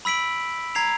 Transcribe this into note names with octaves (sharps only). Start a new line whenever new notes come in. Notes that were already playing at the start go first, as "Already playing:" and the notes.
B5 E6 B6 D7 F#7
A#5 G#6 C7 F7